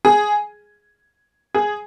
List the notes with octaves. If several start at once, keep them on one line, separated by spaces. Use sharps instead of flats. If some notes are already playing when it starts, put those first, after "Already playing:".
G#4
G#4